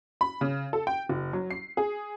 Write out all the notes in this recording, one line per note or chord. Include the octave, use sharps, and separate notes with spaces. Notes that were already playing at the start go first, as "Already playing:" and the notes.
B5
C#3
A4
G5
F#1
F#3
C7
G#4